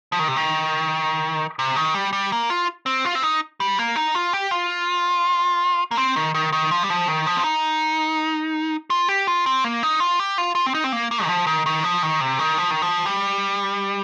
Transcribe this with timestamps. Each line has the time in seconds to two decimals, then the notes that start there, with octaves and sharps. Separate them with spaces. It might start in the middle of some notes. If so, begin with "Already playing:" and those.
0.12 F3
0.19 D#3
0.28 C3
0.36 D#3
1.59 C3
1.76 D#3
1.94 G3
2.13 G3
2.32 A#3
2.50 F4
2.86 C4
3.05 F4
3.15 C4
3.22 D#4
3.60 G3
3.79 A#3
3.96 D#4
4.15 F4
4.33 G4
4.51 F4
5.91 A#3
5.97 C4
6.16 D#3
6.34 D#3
6.52 D#3
6.71 F3
6.83 G3
6.90 F3
7.08 D#3
7.26 F3
7.37 C4
7.44 D#4
8.90 F4
9.08 G4
9.27 F4
9.46 C4
9.64 A#3
9.83 D#4
10.00 F4
10.20 G4
10.38 F4
10.55 F4
10.66 C4
10.74 D#4
10.84 C4
10.92 A#3
11.11 A#3
11.24 D#3
11.29 F3
11.47 D#3
11.66 D#3
11.84 F3
12.03 D#3
12.21 C3
12.39 D#3
12.58 F3
12.71 D#3
12.82 F3
13.06 G3